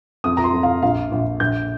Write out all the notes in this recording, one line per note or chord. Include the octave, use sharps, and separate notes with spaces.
F2 D#6
A#5
C6
F2
F5
A#1 F5
A#1
A#1 G6